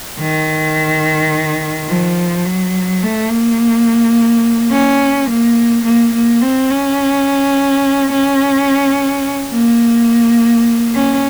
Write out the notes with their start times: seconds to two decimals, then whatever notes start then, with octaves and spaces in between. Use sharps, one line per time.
0.20 D#3
1.89 F3
2.46 F#3
3.03 A3
3.30 A#3
4.72 C#4
5.29 A#3
5.85 A#3
6.14 A#3
6.42 C4
6.71 C#4
8.12 C#4
9.53 A#3
10.94 C#4